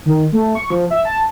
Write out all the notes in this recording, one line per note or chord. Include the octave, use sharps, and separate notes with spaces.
D#3
A3
C#6
F3
E5
A5